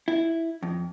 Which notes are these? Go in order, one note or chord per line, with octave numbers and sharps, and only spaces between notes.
E4
F2